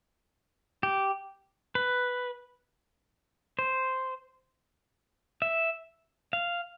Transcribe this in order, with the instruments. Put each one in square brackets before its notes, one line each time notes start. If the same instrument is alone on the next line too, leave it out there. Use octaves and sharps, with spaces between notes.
[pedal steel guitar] G4
B4
C5
E5
F5